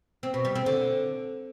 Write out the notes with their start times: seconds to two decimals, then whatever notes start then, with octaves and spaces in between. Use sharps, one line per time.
0.23 C4
0.34 B2
0.45 G3
0.55 C4
0.66 D3